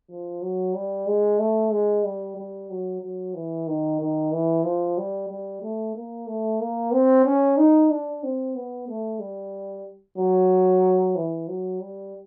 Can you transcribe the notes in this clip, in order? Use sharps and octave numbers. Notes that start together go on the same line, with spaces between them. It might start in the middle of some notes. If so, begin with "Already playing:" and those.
F3
F#3
G3
G#3
A3
G#3
G3
G3
F#3
F#3
E3
D#3
D#3
E3
F3
G3
G3
A3
A#3
A3
A#3
C4
C#4
D#4
D4
C4
B3
A3
G3
F#3
E3
F#3
G3